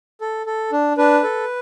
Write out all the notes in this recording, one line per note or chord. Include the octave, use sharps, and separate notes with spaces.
A4
A4
D4
D4 B4
A4